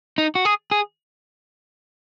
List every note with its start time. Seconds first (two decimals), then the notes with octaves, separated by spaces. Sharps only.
0.18 D#4
0.35 F#4
0.45 G#4
0.71 G#4